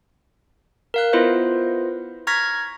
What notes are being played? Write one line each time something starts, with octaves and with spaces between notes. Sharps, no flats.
A#4 F5 F#6
B3 E4 F4 B4 C5 D#5
A#5 C#6 F6 G#6 A#6 B6